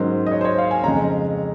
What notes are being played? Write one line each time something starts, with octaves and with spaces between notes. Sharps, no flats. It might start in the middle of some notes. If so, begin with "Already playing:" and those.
Already playing: G#2 D#3 F#3 C#4 C5
D#5
C#5
C5
C#5
F5
G#5
F2 C#3 G#3 C#4 A#5